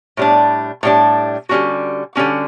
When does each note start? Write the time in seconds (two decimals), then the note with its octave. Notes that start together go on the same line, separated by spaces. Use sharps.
0.17 A2 G3 D4
0.83 A2 G3 D4
1.49 D3 G3 C#4 F#4
2.16 D3 G3 C#4 F#4